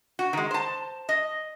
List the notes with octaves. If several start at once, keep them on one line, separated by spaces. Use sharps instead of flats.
F#4
D#3 G#3
C5 A5
D#5